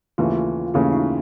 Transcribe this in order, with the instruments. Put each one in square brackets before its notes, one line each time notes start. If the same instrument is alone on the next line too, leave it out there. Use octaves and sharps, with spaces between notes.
[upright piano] D#2 C#3 E3 A3 C#4 [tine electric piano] F4
[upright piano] D#2 C#3 E3 A3 C#4 [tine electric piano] E4
[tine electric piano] D#4